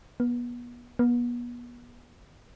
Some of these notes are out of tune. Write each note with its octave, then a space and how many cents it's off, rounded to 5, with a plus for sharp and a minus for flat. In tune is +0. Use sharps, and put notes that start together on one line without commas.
B3 -30
B3 -35